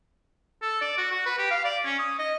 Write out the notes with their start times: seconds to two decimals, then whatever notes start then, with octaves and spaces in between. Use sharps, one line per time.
0.62 A4
0.82 D5
0.98 F#4
1.12 F#4
1.26 B4
1.39 G4
1.51 F5
1.65 D5
1.85 C#4
1.99 D#6
2.19 D#5